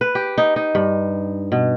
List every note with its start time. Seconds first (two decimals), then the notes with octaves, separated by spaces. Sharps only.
0.01 B4
0.15 G4
0.38 D#4
0.56 D#4
0.75 G2
1.52 B2